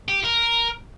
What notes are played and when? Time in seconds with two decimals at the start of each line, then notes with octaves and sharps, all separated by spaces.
0.08 G4
0.24 A#4